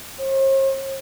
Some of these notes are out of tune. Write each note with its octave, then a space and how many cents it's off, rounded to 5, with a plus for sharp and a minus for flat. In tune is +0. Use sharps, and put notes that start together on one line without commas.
C5 +45